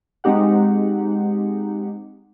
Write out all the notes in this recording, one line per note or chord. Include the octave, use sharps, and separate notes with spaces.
G#3 C4 D#4 G4 F#5